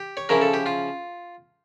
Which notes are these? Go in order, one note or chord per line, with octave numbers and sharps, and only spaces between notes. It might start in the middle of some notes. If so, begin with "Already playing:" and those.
Already playing: G4
C#5
C#3 F3 C#4 E4 A#4
A4
G4
F4